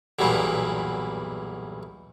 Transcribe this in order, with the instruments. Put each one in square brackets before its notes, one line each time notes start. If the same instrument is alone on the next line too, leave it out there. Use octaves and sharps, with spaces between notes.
[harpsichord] B1 E2 G2 A#2 E3